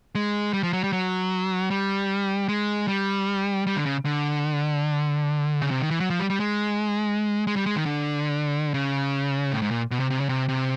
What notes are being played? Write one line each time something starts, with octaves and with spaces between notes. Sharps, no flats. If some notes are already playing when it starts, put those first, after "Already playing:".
G#3
G3
F3
F#3
G3
F#3
G3
G#3
G3
G3
D3
C#3
D3
C#3
C3
D#3
E3
F#3
F3
G3
G3
G#3
G#3
G3
G#3
D#3
D3
C#3
A2
G#2
A#2
B2
C3
C3
C#3
C3
C3